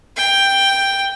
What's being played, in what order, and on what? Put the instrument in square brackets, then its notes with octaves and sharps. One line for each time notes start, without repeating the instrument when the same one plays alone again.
[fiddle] G5